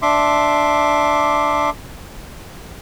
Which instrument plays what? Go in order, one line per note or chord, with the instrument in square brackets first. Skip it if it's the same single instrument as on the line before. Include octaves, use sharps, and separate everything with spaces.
[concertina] D4 E5 C6 D6